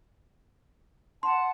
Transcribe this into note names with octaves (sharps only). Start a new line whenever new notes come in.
F#5 A5 C6